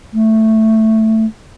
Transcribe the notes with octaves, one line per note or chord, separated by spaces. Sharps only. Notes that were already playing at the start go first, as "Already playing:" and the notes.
A3